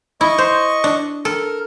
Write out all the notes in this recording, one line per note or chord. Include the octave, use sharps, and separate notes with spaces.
E4 D#5 C#6
C5
D4
A4 A#4